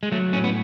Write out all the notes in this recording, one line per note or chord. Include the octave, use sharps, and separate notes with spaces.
G#3
F#3 A3
A2 C#4
B3